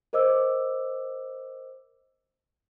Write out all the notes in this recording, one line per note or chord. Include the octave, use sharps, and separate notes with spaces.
A#4 C5 D#5 D6 E6